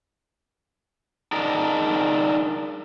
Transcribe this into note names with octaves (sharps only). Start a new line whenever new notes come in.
D4 D#4 G#4 A#4 D5 D#5